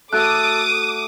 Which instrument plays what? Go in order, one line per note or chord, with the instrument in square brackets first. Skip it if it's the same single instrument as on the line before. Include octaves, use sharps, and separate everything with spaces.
[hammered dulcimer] A3 F#4 [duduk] A4 [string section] D6 D#6 [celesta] F#6